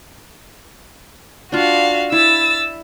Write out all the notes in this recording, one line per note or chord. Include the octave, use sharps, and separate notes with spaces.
D4 F4 F#4 F5
E4 E6 A6